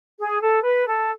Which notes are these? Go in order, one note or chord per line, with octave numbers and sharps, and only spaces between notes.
G#4
A4
B4
A4